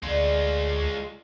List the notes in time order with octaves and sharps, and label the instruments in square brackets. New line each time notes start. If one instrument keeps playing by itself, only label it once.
[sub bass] D2 [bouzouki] D3 [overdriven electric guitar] G#3 F4